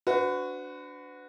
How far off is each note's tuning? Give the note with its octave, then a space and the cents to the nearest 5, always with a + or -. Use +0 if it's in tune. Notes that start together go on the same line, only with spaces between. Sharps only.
D4 -15 F#4 -10 B4 +35